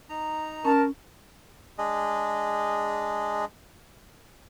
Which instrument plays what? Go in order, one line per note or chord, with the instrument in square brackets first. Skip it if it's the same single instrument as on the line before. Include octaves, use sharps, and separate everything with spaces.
[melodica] D#4 A#5
[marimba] C#4 [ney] A#4 [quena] A5
[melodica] G#3 D4 G#4 D#5